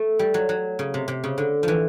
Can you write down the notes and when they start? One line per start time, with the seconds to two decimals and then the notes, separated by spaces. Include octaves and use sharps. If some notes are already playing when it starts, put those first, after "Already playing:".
Already playing: A3
0.19 G3
0.34 F#3
0.49 F#3
0.79 C#3
0.94 C3
1.08 C3
1.24 C#3
1.38 D3
1.63 E3 F3